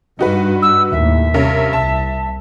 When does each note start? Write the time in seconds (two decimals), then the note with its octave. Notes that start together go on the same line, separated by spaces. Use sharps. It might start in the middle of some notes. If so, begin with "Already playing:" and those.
0.19 G2 D#4 F#4 B4
0.62 E6
0.92 D#2 A2 E5
1.34 G2 C3 C#4 A#4
1.73 C2 A5